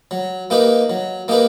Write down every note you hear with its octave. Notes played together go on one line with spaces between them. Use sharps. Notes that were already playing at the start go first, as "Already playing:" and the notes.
F#3
A#3 D#4 G4 B4
F#3
A#3 D#4 G4 B4